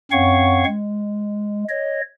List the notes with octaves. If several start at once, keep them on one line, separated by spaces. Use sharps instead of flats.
F#2 C4 C#5 F5 F#5 C#6
G#3
C#5 D#5